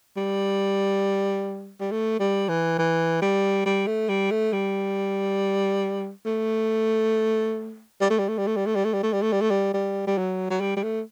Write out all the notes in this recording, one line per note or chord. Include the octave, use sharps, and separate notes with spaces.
G3
G3
A3
G3
E3
E3
G3
G3
A3
G3
A3
G3
A3
G3
A3
G3
A3
G3
A3
G3
A3
G3
A3
G3
A3
G3
A3
G3
A3
G3
G3
G3
F#3
F#3
G3
G3
A3